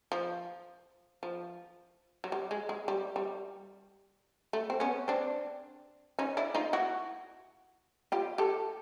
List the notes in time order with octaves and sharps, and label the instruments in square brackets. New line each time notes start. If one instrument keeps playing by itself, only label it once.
[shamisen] F3
F3
F#3
G3
G#3
G#3
G3
G3
A3
C4
B3 C#4
C4 D4
C#4 D#4
D4 E4
D#4 F4
E4 F#4
F4 G4
G4 A4